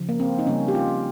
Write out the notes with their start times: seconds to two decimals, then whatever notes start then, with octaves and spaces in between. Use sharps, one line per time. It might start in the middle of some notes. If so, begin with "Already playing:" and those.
Already playing: C#3 F3
0.09 A#3
0.20 C4
0.39 D#4
0.47 C#3 G3 A#3 C#4
0.68 G4
0.75 F4